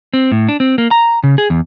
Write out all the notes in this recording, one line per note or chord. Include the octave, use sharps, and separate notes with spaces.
C4
A2
D4
C4
A#3
A#5
C#3
G#4
E2